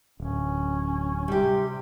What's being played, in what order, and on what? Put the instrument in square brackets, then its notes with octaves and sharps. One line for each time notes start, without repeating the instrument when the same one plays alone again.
[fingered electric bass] D1 [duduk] C#4
[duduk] C3 [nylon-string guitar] G3 G4